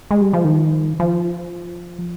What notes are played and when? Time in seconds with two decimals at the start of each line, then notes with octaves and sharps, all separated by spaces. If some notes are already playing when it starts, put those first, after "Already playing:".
0.11 G#3
0.21 G3
0.33 F3
0.44 D#3
1.00 F3